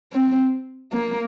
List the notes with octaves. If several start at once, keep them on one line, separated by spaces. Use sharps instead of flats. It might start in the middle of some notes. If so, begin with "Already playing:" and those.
C4
A#3